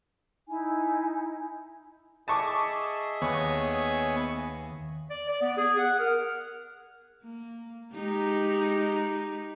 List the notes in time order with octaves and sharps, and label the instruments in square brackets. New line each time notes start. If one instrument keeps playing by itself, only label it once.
[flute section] D#4 E4 [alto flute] G#5
[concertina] G#4 D#5 E5 [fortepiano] A5 C#6 D6
[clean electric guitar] D#2 [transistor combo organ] B3 C#5 G#5
[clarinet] D5
D5
B3
G#4
F#5
A#4
[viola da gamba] A#3
G#3 D#4 G4